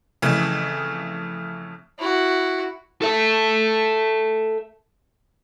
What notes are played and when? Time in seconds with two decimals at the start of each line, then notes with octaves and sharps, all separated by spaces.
0.22 F2 C#3 E3 A3
1.99 E4 F#4
3.02 A4 E5